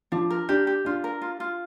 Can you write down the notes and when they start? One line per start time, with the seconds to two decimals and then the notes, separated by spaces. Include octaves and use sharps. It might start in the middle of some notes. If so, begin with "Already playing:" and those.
0.12 F3 D4
0.30 A#4
0.49 D4 G4
0.67 G4
0.85 D4 F4
1.04 A#4
1.22 F4
1.40 F4